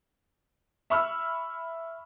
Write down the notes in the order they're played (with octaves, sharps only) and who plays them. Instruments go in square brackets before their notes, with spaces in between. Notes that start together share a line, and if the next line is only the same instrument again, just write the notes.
[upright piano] E5 B5 C#6 E6 F6